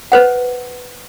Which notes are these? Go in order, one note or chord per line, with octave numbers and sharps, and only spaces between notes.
B4 C5 F#5